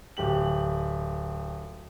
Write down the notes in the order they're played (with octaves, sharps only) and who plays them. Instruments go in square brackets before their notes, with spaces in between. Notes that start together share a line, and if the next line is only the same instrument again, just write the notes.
[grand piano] D1 G4 F#7